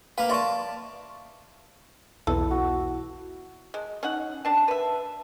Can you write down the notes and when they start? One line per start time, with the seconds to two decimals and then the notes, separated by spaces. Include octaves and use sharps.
0.18 A#3 B4 F5
0.30 D5 E5 A5 C6 C#6
2.27 B1 E2 E4 A4
2.51 F#4
3.74 G#3
4.03 C#4 D#4 F#5
4.45 C4 D4 A5
4.68 B4 E5